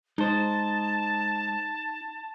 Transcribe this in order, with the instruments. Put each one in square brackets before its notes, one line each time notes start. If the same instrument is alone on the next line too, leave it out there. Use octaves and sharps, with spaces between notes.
[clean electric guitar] G#3 C5 [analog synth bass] D#4 [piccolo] A5